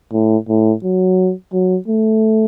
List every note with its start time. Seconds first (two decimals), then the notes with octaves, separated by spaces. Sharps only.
0.13 A2
0.49 A2
0.84 F#3
1.53 F#3
1.88 A3